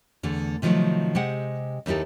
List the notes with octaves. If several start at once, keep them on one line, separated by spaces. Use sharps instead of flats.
E2 D3 A3
C3 D#3 F3 F#3 A3
C3 G#3 G4 C5 F#5
D#2 D#4 E4 G4 A4